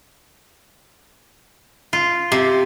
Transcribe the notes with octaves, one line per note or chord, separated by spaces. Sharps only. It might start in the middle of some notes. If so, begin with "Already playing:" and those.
F4
C3